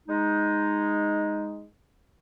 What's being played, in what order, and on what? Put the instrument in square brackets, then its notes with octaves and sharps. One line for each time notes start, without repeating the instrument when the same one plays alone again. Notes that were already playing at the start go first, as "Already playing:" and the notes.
[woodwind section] G#3 D#4